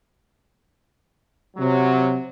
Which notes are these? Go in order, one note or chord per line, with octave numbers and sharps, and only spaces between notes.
C3 F#3